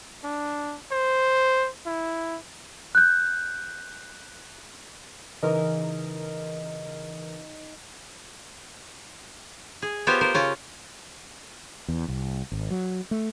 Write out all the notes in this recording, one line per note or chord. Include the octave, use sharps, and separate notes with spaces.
D4
C5
E4
F#6 G6
C#3 E3 D#4 A#4 D#6 E6
G#4
B3 F4 G4 C5 C#5
A#4 C5
C#3 C#4 F4
E2
C2
G#1
F#3
A3